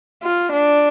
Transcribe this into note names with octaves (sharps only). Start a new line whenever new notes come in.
F4
D4